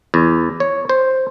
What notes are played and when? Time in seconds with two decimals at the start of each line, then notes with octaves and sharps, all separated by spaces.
0.14 E2
0.60 C#5
0.89 C5